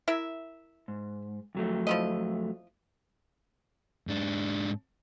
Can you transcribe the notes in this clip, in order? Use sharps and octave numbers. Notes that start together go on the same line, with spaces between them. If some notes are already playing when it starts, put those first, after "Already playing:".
E4 A#4 E5
G#2
F2 F#3 A3
F3 E4 D#5
G#2 D4